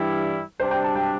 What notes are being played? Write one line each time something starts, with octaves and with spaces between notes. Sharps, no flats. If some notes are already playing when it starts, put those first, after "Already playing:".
Already playing: G2 E3 G3 E4
C3 G3 D4 C5
G5
A5
G5